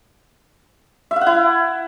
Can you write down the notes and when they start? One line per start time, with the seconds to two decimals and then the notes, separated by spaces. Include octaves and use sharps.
1.11 E5
1.16 F5
1.21 F#5
1.26 E4